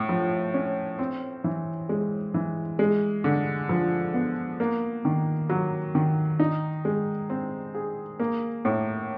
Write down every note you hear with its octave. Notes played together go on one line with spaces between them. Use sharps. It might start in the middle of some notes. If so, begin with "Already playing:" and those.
Already playing: A2
F3
C#4
C4
E3
G#3
E3
G#3
D3
F3
B3
A#3
D#3
F#3
D#3
D#4
G#3
C4
G#4
A#3
A2